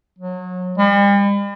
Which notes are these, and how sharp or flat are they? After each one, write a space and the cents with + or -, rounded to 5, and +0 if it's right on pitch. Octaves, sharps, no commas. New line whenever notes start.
F#3 -30
G3 +45